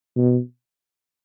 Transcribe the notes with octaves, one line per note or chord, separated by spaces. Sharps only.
B2